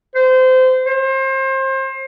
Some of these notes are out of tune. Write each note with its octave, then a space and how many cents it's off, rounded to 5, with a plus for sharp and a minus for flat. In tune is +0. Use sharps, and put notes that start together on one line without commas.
C5 -25
C5 +30